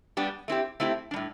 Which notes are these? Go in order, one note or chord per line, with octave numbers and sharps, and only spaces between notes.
G3 B3 D4 G4
A3 C4 E4 G4
A3 C4 E4 G4
D4
A2 G3